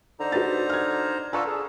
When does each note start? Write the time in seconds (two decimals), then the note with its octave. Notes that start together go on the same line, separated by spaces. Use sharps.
0.20 D3 D#4 C5 A#5
0.32 F#4 B4 A6
0.70 F6 G#6
1.33 D3 F4 A4 B4 A#5 C#6 E6
1.47 G#4 A4